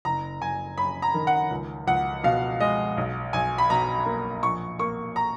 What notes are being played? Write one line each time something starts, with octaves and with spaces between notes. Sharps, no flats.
F#1 A#5
F#1 G#5
F#2 B5
A#5
D#3
F#5
C#2
C#2 F#5
B2 F5
G#3 D#5
B1
B1 G#5
B5
B2 A#5
A#3
A#1 C#6
A#3 C#6
A#5